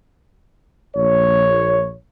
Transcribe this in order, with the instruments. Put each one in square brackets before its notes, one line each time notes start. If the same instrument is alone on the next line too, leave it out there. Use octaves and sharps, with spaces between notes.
[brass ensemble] A#1 C#5